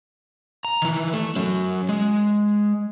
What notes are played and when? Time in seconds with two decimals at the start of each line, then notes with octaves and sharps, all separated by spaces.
0.65 A#5
0.82 D#3 E3
1.13 A3
1.36 F#3 C#4
1.89 G#3